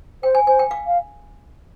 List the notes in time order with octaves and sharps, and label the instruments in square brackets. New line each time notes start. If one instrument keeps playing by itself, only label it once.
[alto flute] C5 [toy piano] G5
[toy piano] G#5
[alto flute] C5 [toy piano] G#5
[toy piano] G5
F5
[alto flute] F5